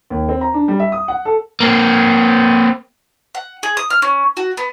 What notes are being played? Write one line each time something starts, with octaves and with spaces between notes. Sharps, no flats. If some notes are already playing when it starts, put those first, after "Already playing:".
D#2
C4
A#5
D4
G3
E5
D#6
F#5
A4
A#3 C4
F#5
G#4
D#6
F6
C#4
F#4
B3